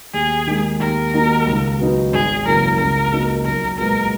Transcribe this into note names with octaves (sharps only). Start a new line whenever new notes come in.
D#2 G#4
D#3 G#3 D#4
D#2 A#4
D#3 A#3 D#4 F#4
C#2
B2 F#3 B3 D#4
G#1 G#4
F#2 C#3 E3 A#3 A#4
C#2 A#4
B2 A#3 D#4
B1 A#4
A#2 G#3 B3 A#4